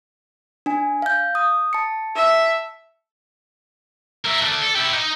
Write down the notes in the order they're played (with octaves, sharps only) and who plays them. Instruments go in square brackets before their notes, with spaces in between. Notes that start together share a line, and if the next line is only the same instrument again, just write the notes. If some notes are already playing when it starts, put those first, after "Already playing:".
[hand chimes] D4 G#5
F5 G6
D#6
A5 C#7
[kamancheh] E5
[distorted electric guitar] A#4 E5
A3 D4
A4
E4 G4
D#4